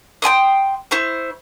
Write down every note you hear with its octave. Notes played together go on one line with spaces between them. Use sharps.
G5 G#5 C6 D#6
E4 C5 C#6